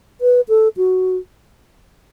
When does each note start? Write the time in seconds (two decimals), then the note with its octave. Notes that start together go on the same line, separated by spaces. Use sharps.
0.21 B4
0.49 A4
0.77 F#4